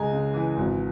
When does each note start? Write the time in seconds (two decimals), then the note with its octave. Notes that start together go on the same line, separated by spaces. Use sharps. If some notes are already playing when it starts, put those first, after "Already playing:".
Already playing: C#2 C#3 G#3 G#5 A#5
0.12 C#3
0.34 E3
0.57 G#1